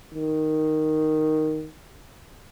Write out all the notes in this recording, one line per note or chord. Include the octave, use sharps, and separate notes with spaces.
D#3